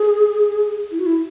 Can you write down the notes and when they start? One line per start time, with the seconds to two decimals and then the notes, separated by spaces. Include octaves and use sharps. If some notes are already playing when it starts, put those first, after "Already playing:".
Already playing: G#4
0.91 E4
0.99 F#4
1.06 E4